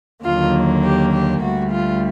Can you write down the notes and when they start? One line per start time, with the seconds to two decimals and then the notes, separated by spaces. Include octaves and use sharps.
0.24 D#2 D3 F#3 A#3 F4
0.84 G4
1.13 G4
1.41 D2 D3 G3 F#4
1.71 F4